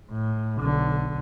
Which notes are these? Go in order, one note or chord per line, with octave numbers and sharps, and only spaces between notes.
A2
B1 D3